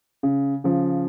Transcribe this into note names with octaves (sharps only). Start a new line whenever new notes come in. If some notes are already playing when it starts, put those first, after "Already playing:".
C#3
C#3 F3